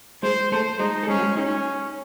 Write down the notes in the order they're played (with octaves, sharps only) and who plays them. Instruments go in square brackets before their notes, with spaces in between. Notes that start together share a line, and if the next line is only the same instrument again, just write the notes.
[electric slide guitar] G#3 G#4 [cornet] C5
[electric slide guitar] A3 A4 [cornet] C5
[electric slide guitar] G#3 G#4 [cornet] D#4
[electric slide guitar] A4
[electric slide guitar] G#3 G#4 [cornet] C#4
[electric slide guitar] F#4
G#3 G#4
[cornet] C#4 [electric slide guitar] D#4 D#5